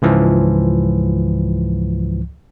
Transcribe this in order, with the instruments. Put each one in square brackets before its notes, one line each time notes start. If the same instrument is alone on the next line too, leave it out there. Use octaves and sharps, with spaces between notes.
[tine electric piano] C#2 G#2 E3 F3